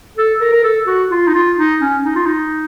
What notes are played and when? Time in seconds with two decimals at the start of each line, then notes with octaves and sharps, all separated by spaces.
0.17 A4
0.41 A#4
0.52 A#4
0.64 A4
0.87 F#4
1.11 F4
1.27 D#4
1.34 F4
1.58 D#4
1.81 C#4
2.05 D#4
2.15 F4
2.26 D#4